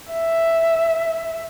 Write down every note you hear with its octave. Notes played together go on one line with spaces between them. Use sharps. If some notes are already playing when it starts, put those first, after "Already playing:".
E5